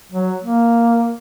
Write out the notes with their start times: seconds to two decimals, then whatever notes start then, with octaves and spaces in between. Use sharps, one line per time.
0.12 F#3
0.44 A#3